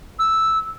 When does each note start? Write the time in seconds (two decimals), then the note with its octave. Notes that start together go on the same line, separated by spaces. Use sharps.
0.19 E6